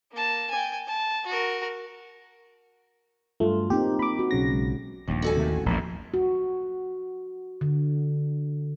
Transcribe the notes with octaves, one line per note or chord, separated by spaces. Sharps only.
A#3 A5
G5 G#5
A5
F#4 A#4
G2 F#3 A3 F4
A#3 C4 D#4 G4
A#3 B5 D6
F#4
B1 C#3 A#6
G#3
D#1 A#1 D#2
F#4 A4 G#5
C3 D#3 A3
A1
A#1 E2
F#4
D3